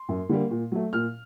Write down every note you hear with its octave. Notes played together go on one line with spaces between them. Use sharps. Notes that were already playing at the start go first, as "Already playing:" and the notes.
Already playing: C6
F#2
D3 G3 A#3
A#2
F#3 A3
A#2 F6